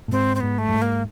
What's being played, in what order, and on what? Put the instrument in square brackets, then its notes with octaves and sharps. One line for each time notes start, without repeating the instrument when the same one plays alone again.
[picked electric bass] A2
[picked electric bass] G#2 [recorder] C4
[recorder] C4
[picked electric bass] G#2 [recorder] B3
[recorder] A3
[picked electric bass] G2
G#2
[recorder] A#3